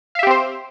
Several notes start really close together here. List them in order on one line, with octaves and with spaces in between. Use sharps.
F5 E5 G4 C4 C5